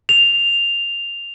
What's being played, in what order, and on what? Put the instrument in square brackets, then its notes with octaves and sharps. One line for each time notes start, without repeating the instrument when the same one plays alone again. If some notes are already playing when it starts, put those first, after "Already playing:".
[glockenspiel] F7